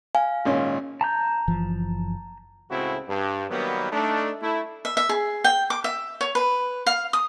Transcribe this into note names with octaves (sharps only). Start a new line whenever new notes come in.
F5 G#5
G#1 A#2 C#4
A5 A#5 G6
F#1 E3 F3
C#2 A2 C#3 C4 E4 F#4
G2
D#3 F#3 G3 A#3 B3
A3 D4 D#4
A3 E4
E5
E5
G#4
G5
D6
E5
C#5
B4
F5
D#6